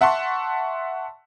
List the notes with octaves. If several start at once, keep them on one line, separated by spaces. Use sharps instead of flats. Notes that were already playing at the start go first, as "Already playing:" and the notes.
E5 F#5 A5 C6 C#6